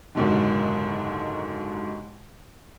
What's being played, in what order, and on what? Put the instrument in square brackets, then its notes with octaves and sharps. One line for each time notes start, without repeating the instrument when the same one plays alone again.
[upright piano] F#1 D#2 G#2 B2 D3